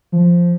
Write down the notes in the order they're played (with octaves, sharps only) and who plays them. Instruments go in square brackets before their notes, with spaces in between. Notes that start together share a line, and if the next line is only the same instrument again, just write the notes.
[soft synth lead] F3